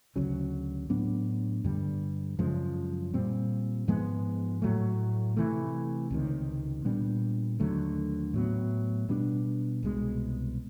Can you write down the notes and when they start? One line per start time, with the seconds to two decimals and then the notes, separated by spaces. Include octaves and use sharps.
0.16 D2 C#3 F#3
0.89 A2 F#3 B3 D4
1.64 G2 D3 G3
2.39 F#2 C#3 F3 G#3
3.14 A#2 G3 C4
3.88 G#2 F3 G#3 B3
4.62 A2 F#3 A3
5.37 C3 E3 A3
6.10 C#2 C3 D#3
6.85 A#2 G3 B3 D4
7.60 D#2 D3 F#3 A3
8.34 A2 F#3 B3
9.09 B2 G3 B3 D4
9.83 C2 B2 G#3